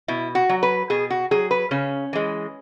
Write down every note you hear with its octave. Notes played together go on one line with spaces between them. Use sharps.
B2 E4
F#4
F#3
B4
B2 G#4
F#4
F#3 G#4
B4
C#3 C#4
E3 G#3